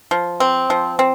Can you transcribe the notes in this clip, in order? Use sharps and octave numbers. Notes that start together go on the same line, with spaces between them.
F3
C4
F3
C4